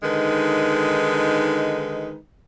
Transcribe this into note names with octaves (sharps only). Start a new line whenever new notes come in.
D3 D#3 G#3 D#4 B4